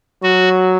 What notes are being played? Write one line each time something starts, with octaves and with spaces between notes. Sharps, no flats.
F#3 F#4